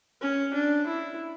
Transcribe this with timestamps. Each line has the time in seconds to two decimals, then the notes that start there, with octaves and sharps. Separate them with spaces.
0.21 C#4
0.54 D4
0.87 E4